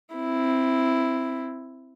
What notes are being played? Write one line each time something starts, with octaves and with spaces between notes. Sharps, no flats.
C4 E4